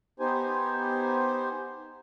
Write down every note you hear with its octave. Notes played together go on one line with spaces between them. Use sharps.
B3 D#4 G4 C5 G#5